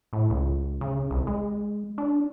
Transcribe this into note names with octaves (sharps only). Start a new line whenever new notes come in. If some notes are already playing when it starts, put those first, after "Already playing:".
A2
C#2
C#3
C2
G#3
D4